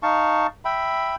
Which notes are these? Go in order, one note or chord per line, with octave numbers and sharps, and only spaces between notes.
D#4 F5 A5 C#6
E5 G5 B5